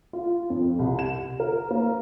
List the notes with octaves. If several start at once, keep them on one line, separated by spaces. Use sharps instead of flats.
F4
F2
C2
E7
A#4
A#3